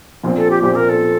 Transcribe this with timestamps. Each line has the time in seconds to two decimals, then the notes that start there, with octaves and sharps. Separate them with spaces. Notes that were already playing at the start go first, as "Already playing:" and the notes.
0.23 A#1 A#2 F3 C4
0.36 A4
0.50 G4
0.63 A#1 A#2 F3 C4 G4
0.75 A#4
0.89 A4